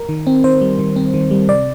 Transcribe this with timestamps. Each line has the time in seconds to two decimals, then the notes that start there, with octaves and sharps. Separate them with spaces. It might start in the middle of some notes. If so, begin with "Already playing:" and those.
Already playing: A#4
0.09 D#3
0.27 C4
0.44 D#3 C5
0.61 G3
0.79 D#3
0.96 C4
1.14 D#3
1.31 G3
1.49 C3 D5